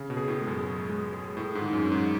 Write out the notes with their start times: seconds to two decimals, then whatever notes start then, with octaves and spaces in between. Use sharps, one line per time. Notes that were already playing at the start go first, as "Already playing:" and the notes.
Already playing: C#3
0.10 B2
0.17 G#4
0.28 A2
0.41 G#3
0.47 F#2
0.65 G#4
0.89 G#3
1.13 G#4
1.37 A2 G#4
1.55 G#2
1.61 D#3
1.73 F#2
1.85 C#4
1.92 G#2